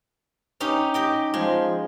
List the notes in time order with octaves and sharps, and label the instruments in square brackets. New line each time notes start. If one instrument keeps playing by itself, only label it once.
[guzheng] C#4 D#4 G4
G4 D#5 G5
[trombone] F3 [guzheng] G#3